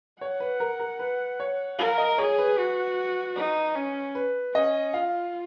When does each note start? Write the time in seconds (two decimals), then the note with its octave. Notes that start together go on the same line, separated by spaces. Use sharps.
0.21 C#5 F#5
0.40 B4
0.60 A#4
0.80 A#4
0.99 B4
1.40 C#5
1.79 A#4 F5
1.98 D#5
2.18 G#4 C#5
2.38 B4
2.58 F#4
3.36 D#4
3.75 C#4
4.15 B4
4.54 C#4 D#5
4.94 F4 F5